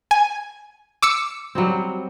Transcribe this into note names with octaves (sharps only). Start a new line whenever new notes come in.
G#5
D6 E6 C#7
F#3 G3 C4